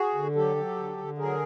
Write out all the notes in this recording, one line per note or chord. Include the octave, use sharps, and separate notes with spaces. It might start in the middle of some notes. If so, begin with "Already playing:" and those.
Already playing: F#4 G#4
D3
F#3 G4 A4
F#3
D3
D3
F#3 G#4 A#4